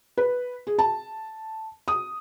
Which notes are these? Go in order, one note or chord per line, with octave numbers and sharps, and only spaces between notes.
B4
G#4
A5
D#6